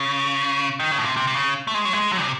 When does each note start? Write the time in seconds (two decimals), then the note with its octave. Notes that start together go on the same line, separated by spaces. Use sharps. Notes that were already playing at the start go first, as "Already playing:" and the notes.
Already playing: C#3
0.80 D#3
0.91 C#3
0.98 A2
1.04 C3
1.17 C3
1.27 C3
1.35 C#3
1.67 A3
1.74 G#3
1.85 F#3
1.93 G#3
2.12 F#3
2.23 C3